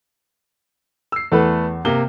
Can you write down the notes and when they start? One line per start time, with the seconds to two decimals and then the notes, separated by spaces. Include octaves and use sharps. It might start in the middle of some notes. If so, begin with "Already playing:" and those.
1.12 E6 C7
1.32 E2 A3 A4 B4
1.85 C3 A#3 G7